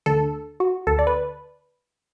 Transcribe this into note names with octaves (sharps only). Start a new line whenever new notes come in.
D2 D3 A4
F#4
D2 D3 A4
D5
B4